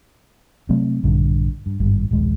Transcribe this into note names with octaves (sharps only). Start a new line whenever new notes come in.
C3 F#3 A3 C4
A#1 G2 D3
G2
G#1 G2
D#1 A#1 G#3